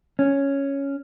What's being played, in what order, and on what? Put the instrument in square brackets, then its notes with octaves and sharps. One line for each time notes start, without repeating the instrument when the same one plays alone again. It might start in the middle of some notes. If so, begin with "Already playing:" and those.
[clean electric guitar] C#4